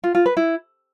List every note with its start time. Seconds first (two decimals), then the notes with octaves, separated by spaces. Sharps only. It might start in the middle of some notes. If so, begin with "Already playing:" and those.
0.04 F4
0.15 F4
0.26 B4
0.37 E4